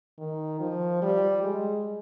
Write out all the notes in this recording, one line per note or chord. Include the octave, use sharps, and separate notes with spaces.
D#3
F3
G3
G#3